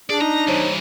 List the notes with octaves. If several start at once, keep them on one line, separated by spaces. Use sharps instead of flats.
D4 G#4 D5
D#4 A#5
G2 E3 C5 C#5 A#5